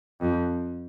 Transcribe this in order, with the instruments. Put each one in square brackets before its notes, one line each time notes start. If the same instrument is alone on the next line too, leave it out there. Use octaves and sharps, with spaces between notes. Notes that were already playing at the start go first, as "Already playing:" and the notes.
[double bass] F2